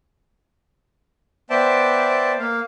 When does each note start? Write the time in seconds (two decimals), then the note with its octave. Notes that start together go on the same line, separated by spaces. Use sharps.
1.50 B3 C5 D5 E5 G5 A5
2.39 A#3 F5